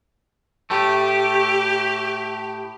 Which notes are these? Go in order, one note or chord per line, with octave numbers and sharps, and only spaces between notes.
A2 A3 G4